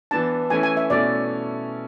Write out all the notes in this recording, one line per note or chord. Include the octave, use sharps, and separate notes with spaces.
E3 B3 D4 A5
E3 A3 C#4 E4 G#5
G#5
E5
B2 A3 C#4 E4 D5